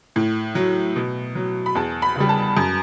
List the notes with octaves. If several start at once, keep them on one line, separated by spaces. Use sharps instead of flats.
A2
F#3
B2
F#3
B5
E2 A5
B5
C#3 G3
A5
F#2